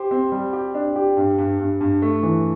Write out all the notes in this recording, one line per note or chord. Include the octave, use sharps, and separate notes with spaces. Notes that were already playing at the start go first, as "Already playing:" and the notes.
Already playing: G4 C5
C4
G3
G4
D4
G4
G2
G2
G2
G2
A3
E3